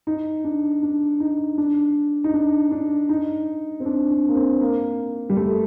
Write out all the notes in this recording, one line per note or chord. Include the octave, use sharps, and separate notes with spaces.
D#4
D4
D4
D#4
D4
D#4
D4
D4
D#4
C4
D4
D4
A#3
C4
A#3
G3
A3